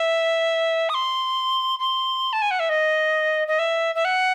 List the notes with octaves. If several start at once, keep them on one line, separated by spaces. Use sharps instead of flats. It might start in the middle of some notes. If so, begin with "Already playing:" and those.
Already playing: E5
D#6
C6
C6
A5
G#5
F#5
E5
D#5
D#5
E5
E5
F#5